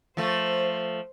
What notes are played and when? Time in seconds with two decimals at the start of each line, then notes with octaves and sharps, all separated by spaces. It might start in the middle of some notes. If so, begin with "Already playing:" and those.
0.17 F3 A3 C5